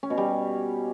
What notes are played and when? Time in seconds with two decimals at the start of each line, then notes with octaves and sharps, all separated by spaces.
0.03 C#4
0.10 B2
0.17 G3